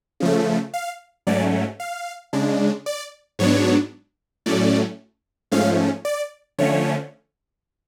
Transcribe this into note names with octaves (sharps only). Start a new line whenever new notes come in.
C#3 F3 A3
F5
G#2 F#3 A3 C#4 D5
F5
C#3 G#3 D4
D5
G#2 F#3 B3 D4 C#5
A2 F#3 A3 C#4 D5
G#2 F3 A3 C#4 F5
D5
D3 F3 A3 C#4 C#5